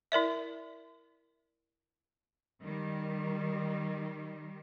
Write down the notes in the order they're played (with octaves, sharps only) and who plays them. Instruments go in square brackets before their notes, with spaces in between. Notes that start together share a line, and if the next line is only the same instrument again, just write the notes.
[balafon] E4 A#4 D5 E5
[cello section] D#3 G3